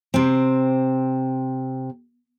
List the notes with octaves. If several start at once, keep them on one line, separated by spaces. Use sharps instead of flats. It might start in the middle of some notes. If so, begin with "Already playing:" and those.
C3 C4